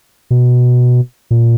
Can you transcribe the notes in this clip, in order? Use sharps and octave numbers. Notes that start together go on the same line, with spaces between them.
B2
A#2